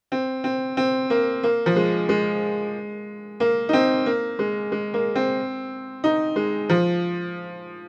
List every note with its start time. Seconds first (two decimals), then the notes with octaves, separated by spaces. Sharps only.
0.12 C4
0.44 C4
0.77 C4
1.10 A#3
1.43 A#3
1.66 F3
1.76 G#3
2.09 G#3
3.40 A#3
3.69 D#4
3.73 C4
4.06 A#3
4.39 G#3
4.72 G#3
4.94 A#3
5.15 C4
6.04 D#4
6.36 G#3
6.69 F3